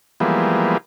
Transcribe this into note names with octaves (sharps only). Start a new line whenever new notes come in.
E3 F3 G3 G#3 A#3 B3